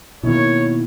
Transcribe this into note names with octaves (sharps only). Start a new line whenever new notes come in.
B2 D#3 A#3 E4 C#5